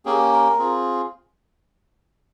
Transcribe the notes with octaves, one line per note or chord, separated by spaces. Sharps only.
A#3 C#4 G4 G#4
A#4
C4 F4 G#4